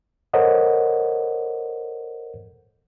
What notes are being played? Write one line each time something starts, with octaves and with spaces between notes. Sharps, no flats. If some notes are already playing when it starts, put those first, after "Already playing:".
A4 A#4 C5 C#5 D#5 F#5